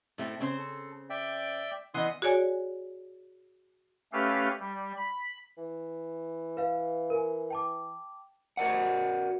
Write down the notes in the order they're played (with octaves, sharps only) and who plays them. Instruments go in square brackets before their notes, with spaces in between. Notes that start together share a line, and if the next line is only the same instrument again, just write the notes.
[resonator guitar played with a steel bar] A2 A3 C4
C#3 C4 C5
[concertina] A4
D5 E5 G5
[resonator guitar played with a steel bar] E3 B3 D#5 [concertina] F#5 C6 D#6
[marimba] F#4 G#4 C#5 D5 G#5
[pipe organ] A3 C#4 G4 A4 B4 F5
G3
B5
[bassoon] E3
[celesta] B4 F5
A#4 G#5
G5 A5 D6
[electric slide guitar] F#4 A#4 D5 F#5